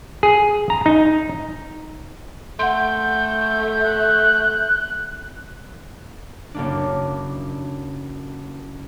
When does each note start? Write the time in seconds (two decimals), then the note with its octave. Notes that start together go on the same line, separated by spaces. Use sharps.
0.23 G#4
0.70 A#5
0.86 D#4
2.59 A3 F#5 C6 G6
3.84 F#6
6.54 F#1 A#3 D4